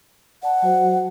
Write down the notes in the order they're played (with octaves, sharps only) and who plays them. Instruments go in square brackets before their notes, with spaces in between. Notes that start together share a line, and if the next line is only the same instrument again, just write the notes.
[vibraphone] D5 A5 [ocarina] F#5
[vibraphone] F#3 F#4 C5